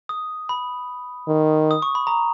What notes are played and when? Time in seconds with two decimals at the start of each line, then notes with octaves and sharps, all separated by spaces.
0.09 D#6
0.49 B5
1.28 D#3
1.71 D#6
1.82 C#6
1.95 B5
2.07 A#5